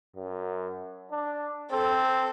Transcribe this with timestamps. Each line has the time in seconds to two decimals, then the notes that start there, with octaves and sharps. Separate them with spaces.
0.16 F#2
1.11 D4
1.71 C4 A4